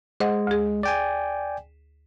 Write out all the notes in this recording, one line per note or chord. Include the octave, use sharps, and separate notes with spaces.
G#3 C5 D#5 F#5
D2 G#4
D5 G5 G#5